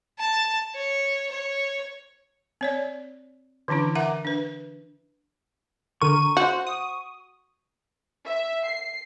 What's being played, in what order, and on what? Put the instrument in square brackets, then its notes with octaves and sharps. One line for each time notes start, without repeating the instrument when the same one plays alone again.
[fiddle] A5
C#5
C#5
[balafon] C4 C#5 D5
D3 E3 C#4 D4 E4
A#4 E5 F#5 A#5 D6
D4 B4
[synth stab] D3 A#4 D#7 [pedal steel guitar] C#6
[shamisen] F#4 [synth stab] C5
[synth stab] D#6
[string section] E5
C7